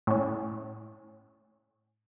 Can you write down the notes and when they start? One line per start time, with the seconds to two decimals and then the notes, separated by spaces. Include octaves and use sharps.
0.07 A2 C#4